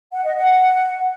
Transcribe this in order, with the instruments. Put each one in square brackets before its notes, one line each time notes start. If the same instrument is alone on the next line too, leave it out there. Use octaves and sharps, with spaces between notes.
[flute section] F#5
D#5
F#5